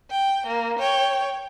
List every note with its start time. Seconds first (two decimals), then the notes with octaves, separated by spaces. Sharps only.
0.11 G5
0.47 A#3
0.79 C#5 G5